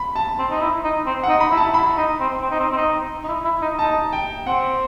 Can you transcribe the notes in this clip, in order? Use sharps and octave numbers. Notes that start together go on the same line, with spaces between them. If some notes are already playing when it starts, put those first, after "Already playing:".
Already playing: B5
A5
C4
D#4
E4
D#4
C4
F#5
D#4
B5
E4
A5
E4 B5
D#4
C4
C4
D#4
C4
C4
D#4
D#4
E4
E4
D#4
D#4 A5
G5
C4 F#5